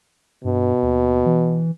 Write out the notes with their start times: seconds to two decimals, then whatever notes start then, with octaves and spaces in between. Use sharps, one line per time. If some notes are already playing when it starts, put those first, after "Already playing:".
0.44 G2 B2
0.82 D#2
1.26 E3